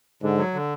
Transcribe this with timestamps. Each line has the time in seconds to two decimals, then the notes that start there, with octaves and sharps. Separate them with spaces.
0.22 G#2 D3
0.38 F#3
0.54 D3